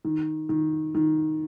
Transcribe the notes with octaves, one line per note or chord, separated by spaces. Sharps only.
D#3
D#3
D#3